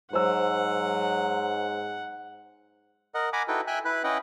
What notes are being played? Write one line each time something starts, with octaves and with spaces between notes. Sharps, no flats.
G#2 F#3 C5 F#5 E6
A#4 D#5 F#5
F#5 G#5 A#5 B5 D6
D#4 E4 F#4 A4 B4 G5
E5 G5 G#5 F#6
E4 B4 B5 F#6
C#4 E4 B4 D#5 F#5 G5